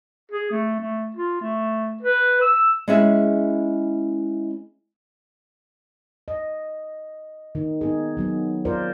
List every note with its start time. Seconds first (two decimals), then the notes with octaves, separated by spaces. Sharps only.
0.31 G#4
0.51 A3
0.80 A3
1.16 F4
1.41 A3
2.03 B4
2.41 E6
2.88 G#3 B3 C#4 E4 G#4 E5
6.28 D#5
7.55 D#3 D#4
7.81 B3 D#4 G#4
8.17 D#3 F#3 B3
8.65 F4 A#4 C5 D5